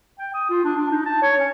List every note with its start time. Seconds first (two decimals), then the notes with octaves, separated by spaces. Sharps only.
0.19 G5
0.34 D#6
0.50 F4
0.64 D4
0.77 D4
0.91 D#4
1.06 A5
1.23 C#5
1.40 C#4